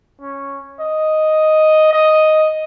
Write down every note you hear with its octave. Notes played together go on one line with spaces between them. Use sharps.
C#4
D#5
D#5